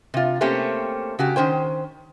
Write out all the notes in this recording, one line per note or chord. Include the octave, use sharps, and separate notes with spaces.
C3 F4
A3 A#3 C4 C#4 G4
C#3 F#4 G4
D#3 C#4 C5 G5